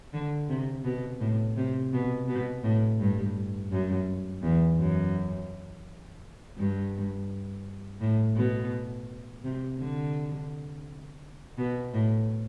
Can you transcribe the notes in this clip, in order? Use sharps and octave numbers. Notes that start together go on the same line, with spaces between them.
D3
C3
B2
A2
C3
B2
B2
A2
G2
F#2
E2
F#2
G2
A2
B2
C3
D3
B2
A2